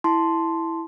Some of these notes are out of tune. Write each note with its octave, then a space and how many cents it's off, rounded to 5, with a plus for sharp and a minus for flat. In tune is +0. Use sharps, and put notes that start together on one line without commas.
E4 +0 A5 +0 C6 -5